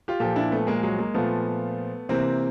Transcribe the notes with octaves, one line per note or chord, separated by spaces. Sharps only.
F4 G4
A#2 F3 G4 A4
D4 E4
A3 B3
G#3 A#3
F#3 G#3
G#3 A#3
A#2 F3 A3 B3
C3 E3 A#3 C4